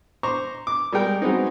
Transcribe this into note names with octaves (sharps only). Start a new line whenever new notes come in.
C5 A#5 C#6 D6
D6
G3 G#3 A#4 G5
F#3 G#3 B3 C4 D#4